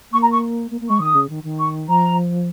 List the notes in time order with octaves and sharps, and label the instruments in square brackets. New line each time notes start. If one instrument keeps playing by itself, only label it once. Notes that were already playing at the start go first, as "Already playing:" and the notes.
[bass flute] A#3 [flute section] C#6
[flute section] A#5
C#6
[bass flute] A#3
A#3
[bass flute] G#3 [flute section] C#6
[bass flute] D#3 [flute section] D#6
[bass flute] C#3
D#3
D#3
[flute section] C#6
[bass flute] F3 [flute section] A#5